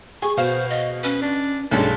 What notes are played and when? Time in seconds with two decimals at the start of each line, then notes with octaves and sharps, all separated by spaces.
0.22 G#4 C#6
0.37 B2 B3 C5 F5
0.70 D#5
1.03 C#4 B4
1.22 D4
1.71 B1 G2 G#3 C#4 A4